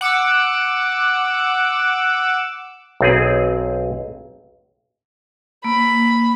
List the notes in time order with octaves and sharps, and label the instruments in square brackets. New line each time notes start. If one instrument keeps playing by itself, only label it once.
[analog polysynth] F#5 D6 E6
[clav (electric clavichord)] B1 C4 G#4
[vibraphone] A#3 [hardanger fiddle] B5